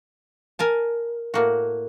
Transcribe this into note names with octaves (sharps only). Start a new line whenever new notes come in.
A#4 G#5 A5
A2 A#3 F#4